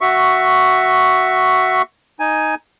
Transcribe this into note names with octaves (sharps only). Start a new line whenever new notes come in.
F#4 E5 C#6
D#4 G#5